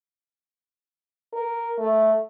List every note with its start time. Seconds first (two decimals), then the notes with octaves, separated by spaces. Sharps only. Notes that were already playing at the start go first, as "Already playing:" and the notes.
1.33 A#4
1.78 A3